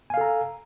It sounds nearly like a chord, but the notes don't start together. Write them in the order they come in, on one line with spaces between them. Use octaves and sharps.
G#5 F5 A4 A#5